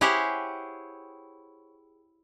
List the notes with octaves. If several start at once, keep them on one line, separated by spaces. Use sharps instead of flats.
E4 G4 G#4 C5 C#5 F#5